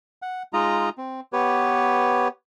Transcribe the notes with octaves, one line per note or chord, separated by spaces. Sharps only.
F#5
G#3 D#4 F4 D#5 A#5
C4
B3 G4 B4 C#5